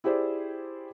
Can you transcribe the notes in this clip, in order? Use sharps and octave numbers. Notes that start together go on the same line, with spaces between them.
E4 G4 G#4 C5 D5